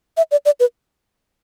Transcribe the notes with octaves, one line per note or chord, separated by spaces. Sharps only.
E5
D5
D5
B4